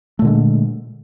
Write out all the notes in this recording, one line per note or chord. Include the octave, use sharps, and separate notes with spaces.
A#2 D3 G#3 A3